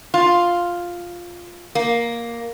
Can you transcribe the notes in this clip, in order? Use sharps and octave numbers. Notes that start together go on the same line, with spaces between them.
F4
A#3